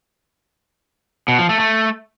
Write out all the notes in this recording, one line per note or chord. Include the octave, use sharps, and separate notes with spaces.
B2
F3
A3
A3